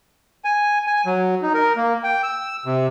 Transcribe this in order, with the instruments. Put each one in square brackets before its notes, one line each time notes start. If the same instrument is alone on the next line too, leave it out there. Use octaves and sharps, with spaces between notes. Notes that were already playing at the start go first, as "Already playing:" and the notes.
[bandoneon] G#5
G#5
F#3
D#4
A#4
A#3
G5
E6
C3